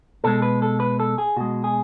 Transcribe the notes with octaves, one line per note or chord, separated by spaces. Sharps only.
B2 G#3 A4
B4
A4
B4
A4
G#4
B2 G#3 F#4
G#4